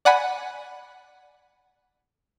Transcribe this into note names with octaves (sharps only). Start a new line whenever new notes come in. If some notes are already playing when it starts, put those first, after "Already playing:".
D5 F#5 G#5 B5